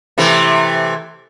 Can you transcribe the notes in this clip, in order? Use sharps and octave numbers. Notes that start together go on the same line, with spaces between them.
C3 E3 A3